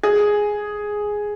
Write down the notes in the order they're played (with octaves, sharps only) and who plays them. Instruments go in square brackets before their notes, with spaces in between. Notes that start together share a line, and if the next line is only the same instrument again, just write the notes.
[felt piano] G#4